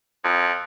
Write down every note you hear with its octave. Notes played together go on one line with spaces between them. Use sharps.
F2